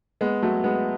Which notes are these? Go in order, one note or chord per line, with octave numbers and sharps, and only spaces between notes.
G#3 B3
F#3 A3
G#3 B3